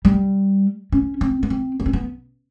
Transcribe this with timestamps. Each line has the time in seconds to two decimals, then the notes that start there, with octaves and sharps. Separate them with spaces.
0.05 G3
0.92 C#4
1.21 C4
1.43 B3
1.50 C4
1.80 B3
1.86 C4
1.93 B3